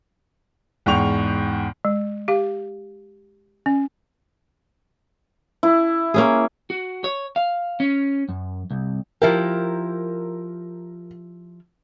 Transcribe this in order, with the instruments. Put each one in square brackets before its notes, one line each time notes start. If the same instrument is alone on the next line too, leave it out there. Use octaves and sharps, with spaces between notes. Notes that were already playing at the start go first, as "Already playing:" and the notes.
[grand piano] E2 G#2 G5 C#6 F7
[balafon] G#3
G4 F5
C#4
[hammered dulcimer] E4
[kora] A#3 C#4 G#4
[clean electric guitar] F#4
C#5
F5
C#4
F#2
C2
[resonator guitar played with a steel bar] F3 E4 G4 [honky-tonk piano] A#4